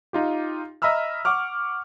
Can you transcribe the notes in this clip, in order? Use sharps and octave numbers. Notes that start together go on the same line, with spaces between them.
D#4 F4 G4
D#5 E5 A#5 B5 E6 F6
F#5 C#6 D6 F6